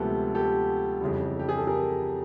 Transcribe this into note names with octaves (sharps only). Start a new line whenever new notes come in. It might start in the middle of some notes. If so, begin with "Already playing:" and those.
Already playing: D2 C3 F3 G#3 B3 G4 A4
G4 A4
F2 C#3 E3 G3
G4
G#4
A4
G#4 A#4